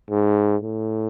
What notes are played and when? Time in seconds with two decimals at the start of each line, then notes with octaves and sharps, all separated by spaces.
0.10 G#2
0.62 A2